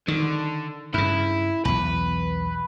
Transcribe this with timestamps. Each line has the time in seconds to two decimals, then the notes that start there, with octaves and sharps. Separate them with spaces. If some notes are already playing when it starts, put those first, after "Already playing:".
0.08 D3 D#3
0.94 G2 C#3 E4
1.65 B1 E2 B4